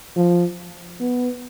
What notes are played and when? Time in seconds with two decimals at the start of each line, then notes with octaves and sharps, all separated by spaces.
0.16 F3
1.00 B3